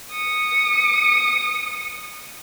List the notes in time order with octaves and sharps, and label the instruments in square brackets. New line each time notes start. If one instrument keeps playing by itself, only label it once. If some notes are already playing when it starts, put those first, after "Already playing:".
[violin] D#6 C#7